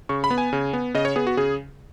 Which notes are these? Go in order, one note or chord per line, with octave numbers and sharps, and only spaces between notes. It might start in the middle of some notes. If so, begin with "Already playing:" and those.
C#3 C#6
B5
B3
G#5
C#3
B3
C#3 D#5
C#5
B3 G#4
F#4
C#3 G#4